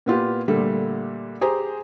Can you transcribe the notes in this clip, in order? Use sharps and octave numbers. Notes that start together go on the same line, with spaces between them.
A#2 B3 F4 G4
A#2 D3 G3 A3
G4 G#4 C5 A#5